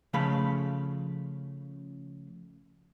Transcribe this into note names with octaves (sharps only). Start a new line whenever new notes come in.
C#3 F3 A3 G#4 F5 B5